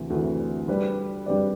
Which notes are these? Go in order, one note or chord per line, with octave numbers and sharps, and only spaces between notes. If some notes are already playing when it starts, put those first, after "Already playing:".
Already playing: D2 C3 E3
D2 C3 E3
G3 D4 G4 B4 D5
G3 D4 G4 B4 D5